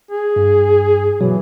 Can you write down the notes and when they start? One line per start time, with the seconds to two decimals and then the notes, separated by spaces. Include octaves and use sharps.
0.11 G#4
0.36 G2
1.21 B2 E3 F#3